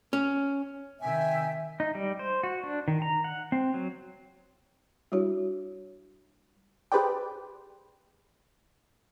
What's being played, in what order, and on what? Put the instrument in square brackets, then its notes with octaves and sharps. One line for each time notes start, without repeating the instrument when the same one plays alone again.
[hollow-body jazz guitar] C#4
[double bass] C3 D#3 [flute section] E5 G5 [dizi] G#5
[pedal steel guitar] D#4
G3
C5
F#4
D4
D#3
A#5
F#5
C4
F#3
[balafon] G3 D4 E4 F#4 C#5
[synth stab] G4 G#4 B4 C5 D5 G5